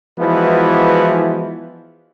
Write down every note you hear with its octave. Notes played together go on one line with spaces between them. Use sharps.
E3 F3 G#3 B3 E4 F#4